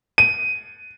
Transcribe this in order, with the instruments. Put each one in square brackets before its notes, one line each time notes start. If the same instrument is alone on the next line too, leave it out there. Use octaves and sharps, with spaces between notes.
[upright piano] D#7